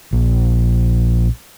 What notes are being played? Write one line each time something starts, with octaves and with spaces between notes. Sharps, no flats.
A#1